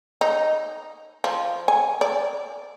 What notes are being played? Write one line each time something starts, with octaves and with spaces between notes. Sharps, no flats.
D#4
F3
G#5
D5